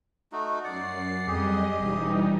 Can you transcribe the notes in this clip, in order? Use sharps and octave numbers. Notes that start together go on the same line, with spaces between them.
A3 D#4 F#4
F#2 D5 F#5 C7
F2 G3 G4 G#4 D#5
E1 E3 G3 D#4